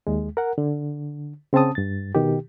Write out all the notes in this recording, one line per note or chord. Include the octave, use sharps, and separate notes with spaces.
D#2 G#3
A#4 F#5
D3
C#3 C4 C#4 A5 D#6
G2 A6
B2 D#3 G4